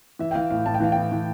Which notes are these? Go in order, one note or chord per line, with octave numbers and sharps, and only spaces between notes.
E3 E5
G5
E3 F5
A2 F5
A2 A5
G5
E3 F5
A2 G5
E3